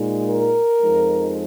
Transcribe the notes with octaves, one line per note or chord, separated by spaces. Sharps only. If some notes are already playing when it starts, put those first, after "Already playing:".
Already playing: A#2 G#3 D#4
A#4
F2 F3 G#3 D#4